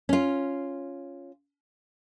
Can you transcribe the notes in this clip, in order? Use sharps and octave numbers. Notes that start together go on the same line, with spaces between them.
C#4 F4